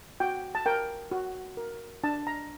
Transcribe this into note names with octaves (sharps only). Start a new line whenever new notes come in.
F#4 G5
A5
A#4 G5
F#4
A#4
D4 A5
A#5